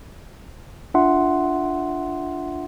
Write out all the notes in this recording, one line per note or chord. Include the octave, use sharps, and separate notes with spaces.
D4 F4 E5 F#5 C6